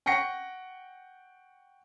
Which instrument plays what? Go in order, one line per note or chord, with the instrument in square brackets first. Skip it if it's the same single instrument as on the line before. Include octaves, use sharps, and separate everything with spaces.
[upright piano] F#5 G5 C#6 A#6 C#7